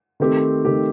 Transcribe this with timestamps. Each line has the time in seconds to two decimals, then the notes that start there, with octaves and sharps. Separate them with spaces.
0.20 D#3 A3 C4 G4
0.65 D#3 A3 C4 G4